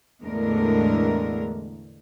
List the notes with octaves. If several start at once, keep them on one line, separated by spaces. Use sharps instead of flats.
E2 A2 D3 G#3 A#4